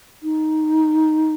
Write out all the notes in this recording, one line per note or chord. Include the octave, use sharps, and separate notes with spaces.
D#4